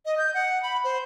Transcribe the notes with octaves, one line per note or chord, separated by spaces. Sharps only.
D#5
G6
F#5
B5
C5